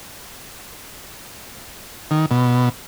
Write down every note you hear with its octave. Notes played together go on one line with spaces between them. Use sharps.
D#3
B2